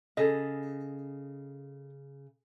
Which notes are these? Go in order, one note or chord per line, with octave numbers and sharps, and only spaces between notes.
C#3 G#4 A4 D#5